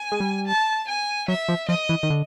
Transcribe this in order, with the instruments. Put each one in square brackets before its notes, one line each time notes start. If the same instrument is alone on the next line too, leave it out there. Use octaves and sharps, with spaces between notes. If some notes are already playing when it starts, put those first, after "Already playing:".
Already playing: [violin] G#5
[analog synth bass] G#3
G3
[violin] A5
G#5
[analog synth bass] F#3 [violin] E5
[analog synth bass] F3
[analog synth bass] F3 [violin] D#5
[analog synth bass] E3
D#3
D3